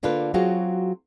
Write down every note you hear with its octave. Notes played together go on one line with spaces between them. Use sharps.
D3 A#3 D4 F4 A4 B4
F#3 C4 F4 F#4 G#4